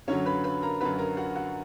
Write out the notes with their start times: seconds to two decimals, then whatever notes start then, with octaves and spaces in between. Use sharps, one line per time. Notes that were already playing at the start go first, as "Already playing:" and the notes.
0.08 F#2 D3 F#3 C#4 C#5
0.26 B4 B5
0.44 B4 B5
0.63 A#4 A#5
0.81 F#2 D3 F#3 B4 B5
0.99 A#4 A#5
1.17 F#4 F#5
1.35 F#4 F#5